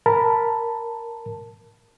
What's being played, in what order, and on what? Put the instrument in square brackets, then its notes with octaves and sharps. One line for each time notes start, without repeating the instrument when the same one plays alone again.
[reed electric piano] A#4 A5 B5